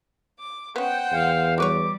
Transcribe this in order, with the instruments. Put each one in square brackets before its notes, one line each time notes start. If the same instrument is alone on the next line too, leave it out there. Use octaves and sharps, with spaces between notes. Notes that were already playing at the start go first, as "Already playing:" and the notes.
[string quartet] D6
[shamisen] B3 C#4 [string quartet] C5 F#5 G5
[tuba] E2 [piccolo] F5
[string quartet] G3 [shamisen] F#4 B4 C#5 [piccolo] D6